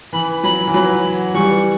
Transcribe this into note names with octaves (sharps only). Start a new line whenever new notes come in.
E3 B5
F#3 B5
E3
F#3 B5
E3 G3 C#6